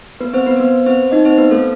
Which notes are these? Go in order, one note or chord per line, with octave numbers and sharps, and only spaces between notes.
B3 B4
C4 C5
B3 B4
C5
B3 B4
C4 C5
D#4 D#5
C4 C5
B3 B4
A3 A4